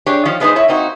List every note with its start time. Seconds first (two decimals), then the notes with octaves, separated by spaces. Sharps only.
0.06 D4 G4 G#4 C#5
0.25 D#3 F3 C#4
0.40 G#3 B3 D4 D#4 G#4 C5
0.56 E4 C#5 E5
0.68 A#3 C4 D#4 F#4